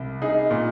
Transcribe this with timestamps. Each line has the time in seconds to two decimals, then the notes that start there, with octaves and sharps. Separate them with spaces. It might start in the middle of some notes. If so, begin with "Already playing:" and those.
Already playing: C2
0.22 D#4 G#4
0.51 A#2